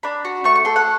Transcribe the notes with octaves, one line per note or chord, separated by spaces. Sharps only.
D4 B5
F#4
A3 C#6
C#6
A4 C6
F#5